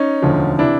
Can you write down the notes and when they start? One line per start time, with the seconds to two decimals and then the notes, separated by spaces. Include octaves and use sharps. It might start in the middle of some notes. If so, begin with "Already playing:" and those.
Already playing: C#4 D#4
0.22 E1 D2 D3 F3
0.58 C3 E3 D4 E4